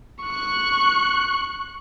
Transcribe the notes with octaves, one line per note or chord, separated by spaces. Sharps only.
C#6 F#6